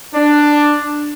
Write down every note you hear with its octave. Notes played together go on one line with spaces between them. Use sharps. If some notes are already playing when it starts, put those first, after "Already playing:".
D4